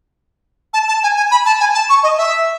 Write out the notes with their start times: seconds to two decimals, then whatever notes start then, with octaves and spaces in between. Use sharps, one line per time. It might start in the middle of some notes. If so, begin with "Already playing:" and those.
0.73 A5
0.88 A5
1.03 G#5
1.17 G#5
1.31 B5
1.45 A5
1.60 G#5
1.74 A5
1.89 C#6
2.03 D#5
2.17 E5